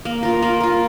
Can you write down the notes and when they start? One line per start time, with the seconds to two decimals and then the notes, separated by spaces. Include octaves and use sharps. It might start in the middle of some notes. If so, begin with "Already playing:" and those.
0.05 A#3
0.23 F4 A#4
0.42 A#3
0.60 F4 A#4